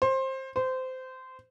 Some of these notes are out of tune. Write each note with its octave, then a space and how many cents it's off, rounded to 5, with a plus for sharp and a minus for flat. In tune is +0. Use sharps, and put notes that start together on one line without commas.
C5 +20
C5 -20